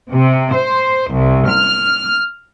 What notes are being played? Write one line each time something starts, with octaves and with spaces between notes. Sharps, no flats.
C3
C5
C2
F6